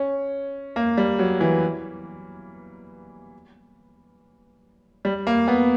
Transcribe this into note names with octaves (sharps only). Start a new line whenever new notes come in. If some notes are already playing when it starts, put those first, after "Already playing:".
Already playing: C#4
A#3
G3
F#3
E3
G3
A#3
B3